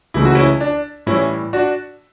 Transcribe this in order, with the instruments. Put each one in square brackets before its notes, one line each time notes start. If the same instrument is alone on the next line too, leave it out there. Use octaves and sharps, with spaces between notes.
[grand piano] C#2 C#3 E3 A3 E4
F#4
C#4 E4
D4
A2 E3 G3 C#4 E4
D4 F#4